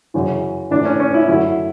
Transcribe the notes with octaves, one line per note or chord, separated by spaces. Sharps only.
F#2 C#3 E3
A2 E3 D4
C#4
C#4
E4
F#2 D3 F#3 E4